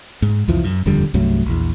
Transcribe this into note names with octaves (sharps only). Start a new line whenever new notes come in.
G#2
C2 F2 E3 F3
F#2
D#1 F2 D3 G3
C2 G2 F#3 A3
A#1 E2